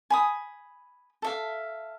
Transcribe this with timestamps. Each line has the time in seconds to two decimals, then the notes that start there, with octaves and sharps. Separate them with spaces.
0.10 G#5 B5 D#6
1.22 A4 E5 F5